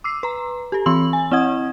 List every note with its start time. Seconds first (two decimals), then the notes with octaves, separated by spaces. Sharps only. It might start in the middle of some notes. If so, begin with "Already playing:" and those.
0.04 D6 E6 C7
0.23 B4 A#5
0.72 G4 A4
0.86 E3 C4 B5 C6 E6 F#7
1.13 G#5
1.31 C4 E4 D#5 F#5 D#6 G#6